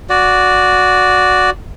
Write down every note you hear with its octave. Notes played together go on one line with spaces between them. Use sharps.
F#4 D5